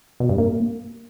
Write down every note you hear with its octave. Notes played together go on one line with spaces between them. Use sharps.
B2
G2
A#3